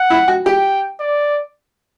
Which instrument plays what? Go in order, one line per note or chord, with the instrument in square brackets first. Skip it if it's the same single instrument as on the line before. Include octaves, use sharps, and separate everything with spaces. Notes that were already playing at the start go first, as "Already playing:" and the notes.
Already playing: [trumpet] F#5
[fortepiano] E4
F#4
[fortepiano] G4 [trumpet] G5
[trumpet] D5